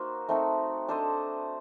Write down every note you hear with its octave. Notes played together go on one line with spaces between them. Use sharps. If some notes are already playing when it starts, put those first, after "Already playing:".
Already playing: A#3 D#4 F#4 C5
A3 C4 D#4 A4
D4 A4 C5 D#5